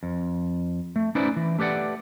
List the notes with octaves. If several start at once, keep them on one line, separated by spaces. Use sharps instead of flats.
F2
A3
C#4 D#4 E4 B4 C5 D5
E3
A3 G4 B4 D5 F#5